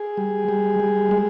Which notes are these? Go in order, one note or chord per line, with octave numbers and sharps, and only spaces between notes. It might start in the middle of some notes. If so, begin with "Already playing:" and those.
Already playing: G#4
G3
G3
G3
G#3